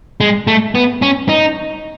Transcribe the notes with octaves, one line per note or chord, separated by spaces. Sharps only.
G#3
A3
B3
C#4
D#4